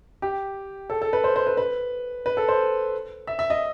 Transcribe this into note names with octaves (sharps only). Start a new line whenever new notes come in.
G4
A4
A4
B4
C5
C5
B4
B4
B4
A4
C5
E5
E5
D#5